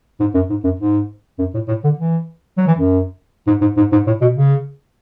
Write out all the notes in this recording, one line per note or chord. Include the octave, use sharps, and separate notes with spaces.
G#2
F#2
G#2
F#2
G#2
F#2
A2
A2
D3
E3
F#3
E3
F#2
G#2
G#2
G#2
G#2
A2
B2
C#3